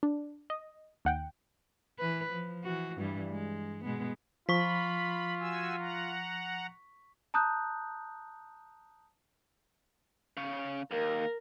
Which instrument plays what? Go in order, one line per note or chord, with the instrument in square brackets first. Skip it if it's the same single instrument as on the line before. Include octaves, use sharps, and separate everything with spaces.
[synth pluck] D4
D#5
D#2 F#5 G5
[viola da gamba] E3 B4
F3
E3 F#4
G2 E3 G3
G#3
B2 G#3 B3
[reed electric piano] F3 [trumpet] F4 [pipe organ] B5 [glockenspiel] C#6 B6
[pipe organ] F#4 G#5 E6
F#5 A#5
[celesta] A5 A#5 D#6 F#6 G6
[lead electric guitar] C#3 C#5
[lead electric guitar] D#2 [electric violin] A#4